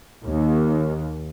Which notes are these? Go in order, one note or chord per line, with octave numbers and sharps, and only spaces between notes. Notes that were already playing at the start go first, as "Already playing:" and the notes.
D#2